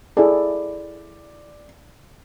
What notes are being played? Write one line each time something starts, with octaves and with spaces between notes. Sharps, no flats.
E4 G#4 A4 D5